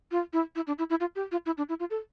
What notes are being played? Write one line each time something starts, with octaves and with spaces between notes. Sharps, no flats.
F4
E4
E4
D4
E4
E4
F4
G4
F4
E4
D4
E4
F4
A4